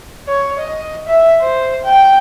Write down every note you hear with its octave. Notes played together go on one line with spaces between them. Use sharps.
C#5
D#5
E5
C5
G5